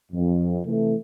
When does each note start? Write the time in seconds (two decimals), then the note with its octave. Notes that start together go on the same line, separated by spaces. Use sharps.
0.12 F2
0.65 C3 E3 A3